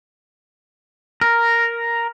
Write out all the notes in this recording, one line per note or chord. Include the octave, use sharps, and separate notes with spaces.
A#4